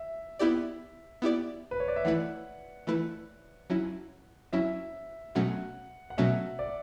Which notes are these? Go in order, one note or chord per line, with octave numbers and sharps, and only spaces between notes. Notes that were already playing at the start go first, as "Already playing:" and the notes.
Already playing: E5
B3 E4 G4 D5
B3 E4 G4 D5
B4
C#5
D5
E5
E3 A3 E4 B4 F#5
E3 A3 E4 B4
F#3 C#4 E4
F#3 C#4 E4 E5
B2 F#3 A3 C#4 F#5
F#5
B2 F#3 A3 C#4 E5
D5